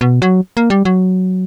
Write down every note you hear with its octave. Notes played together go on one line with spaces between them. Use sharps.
B2
F#3
A#3
G3
F#3